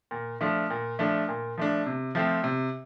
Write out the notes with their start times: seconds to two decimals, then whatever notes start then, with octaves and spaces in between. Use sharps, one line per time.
0.11 A#2
0.41 F3 A3 D4
0.70 A#2
0.99 F3 A3 D4
1.29 A#2
1.58 F3 A3 D4
1.86 C3
2.15 F3 A3 C4
2.44 C3